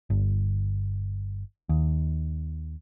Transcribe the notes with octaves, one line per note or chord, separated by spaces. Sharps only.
G1
D#2